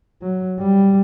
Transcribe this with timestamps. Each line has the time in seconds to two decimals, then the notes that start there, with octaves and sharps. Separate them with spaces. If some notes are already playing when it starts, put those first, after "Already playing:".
0.22 F#3
0.59 G3